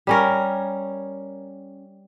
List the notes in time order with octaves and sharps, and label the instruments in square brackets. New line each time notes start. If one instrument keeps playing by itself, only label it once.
[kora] G3 C#4 A#4